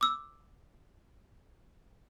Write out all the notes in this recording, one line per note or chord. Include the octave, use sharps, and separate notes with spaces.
D6 E6